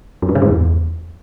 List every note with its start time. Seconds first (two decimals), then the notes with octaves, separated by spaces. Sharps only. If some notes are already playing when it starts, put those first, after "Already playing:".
0.22 F#2
0.29 G2
0.35 C#3
0.42 G#2
0.48 E2